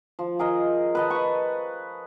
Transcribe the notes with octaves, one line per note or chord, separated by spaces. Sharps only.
F3
G#4 A#4 D#5
B4 D#5 A5
B4 C#6